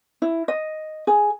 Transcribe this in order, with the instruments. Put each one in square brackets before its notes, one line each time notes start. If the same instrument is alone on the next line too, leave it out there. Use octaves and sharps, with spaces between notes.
[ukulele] E4
D#5
G#4